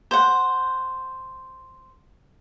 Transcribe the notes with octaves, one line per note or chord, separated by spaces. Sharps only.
C5 F#5